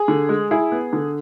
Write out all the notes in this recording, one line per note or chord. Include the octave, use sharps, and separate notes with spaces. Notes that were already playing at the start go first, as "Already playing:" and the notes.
Already playing: G#4
D3
G#3
E4 G#4
B3
D3